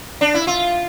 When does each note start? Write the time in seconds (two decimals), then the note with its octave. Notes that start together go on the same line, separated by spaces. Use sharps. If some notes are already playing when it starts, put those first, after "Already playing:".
0.21 D4
0.34 E4
0.47 F4